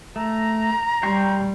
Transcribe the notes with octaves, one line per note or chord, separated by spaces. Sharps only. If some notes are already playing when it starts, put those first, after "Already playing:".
A3 A#5
G3 G5 C6 C#6